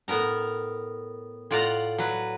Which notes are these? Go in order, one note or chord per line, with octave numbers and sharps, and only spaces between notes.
A2 B3 A#4 A#5
A2 F4 D5 F#5 A#5
F#3 B4